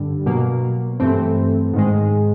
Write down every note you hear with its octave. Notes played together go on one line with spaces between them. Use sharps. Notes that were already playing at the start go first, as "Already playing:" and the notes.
Already playing: G2 D3 G3
B2 F#3 A#3
G2 E3 A3 C4
G#2 D#3 G#3